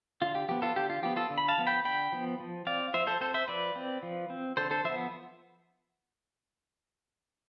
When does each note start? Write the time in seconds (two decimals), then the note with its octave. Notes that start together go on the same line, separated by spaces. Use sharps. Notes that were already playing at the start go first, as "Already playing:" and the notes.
0.21 D3 F4
0.35 G4
0.49 F3 B3 G4
0.62 F4 A4
0.76 D3 G4
0.90 F4
1.02 F3 B3 G4
1.16 F4 A4
1.30 D3
1.38 B5
1.48 F5 A5
1.58 F3 B3
1.67 G5 B5
1.85 D3 G5 B5
2.12 F3 B3
2.40 F3
2.67 C4 D5 F5
2.94 F3 C5 E5
3.07 A4 C5
3.21 C4 A4 C5
3.34 C5 E5
3.48 F3 B4 D5
3.76 C4
4.03 F3
4.30 C4
4.57 D3 A4 C5
4.71 A4 C5
4.84 F3 B3 C5 E5